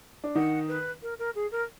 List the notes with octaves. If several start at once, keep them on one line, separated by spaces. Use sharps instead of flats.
D4
D#3 D#4 F#5
B4
A#4
A#4
G#4
A#4